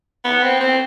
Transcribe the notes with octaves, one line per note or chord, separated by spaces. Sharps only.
B3
C4
C4